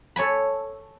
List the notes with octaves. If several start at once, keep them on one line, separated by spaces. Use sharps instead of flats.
A4 C#5 G#5 B5